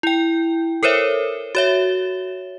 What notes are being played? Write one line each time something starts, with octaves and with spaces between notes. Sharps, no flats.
E4 G5
A4 A#4 C5 C#5 E5
F#4 C#5 E5